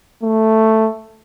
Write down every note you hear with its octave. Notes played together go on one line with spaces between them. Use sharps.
A3